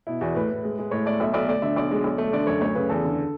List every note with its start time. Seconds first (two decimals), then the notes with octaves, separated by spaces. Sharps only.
0.07 B2 E4
0.21 E2 F#4
0.35 A2 B4
0.50 A2
0.64 G#3
0.78 G#3
0.91 A2 C#5
1.06 A3 D5
1.20 B1 E5
1.34 B1 D5
1.49 D2 D5
1.62 D3 E5
1.76 B1 D5
1.91 G#3
2.04 B1
2.18 A3
2.33 D3 D5
2.47 F#2 C#5
2.61 D2 C#5
2.75 C#3 B4
2.89 E2 A4
3.04 D3